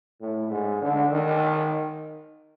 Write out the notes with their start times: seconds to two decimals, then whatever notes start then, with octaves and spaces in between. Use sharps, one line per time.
0.21 A2
0.51 G#2
0.82 D3
1.11 D#3